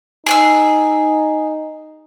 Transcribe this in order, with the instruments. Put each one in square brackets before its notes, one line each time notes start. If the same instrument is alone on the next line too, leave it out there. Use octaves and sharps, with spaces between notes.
[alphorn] D#4 [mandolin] G#4 G#5 E6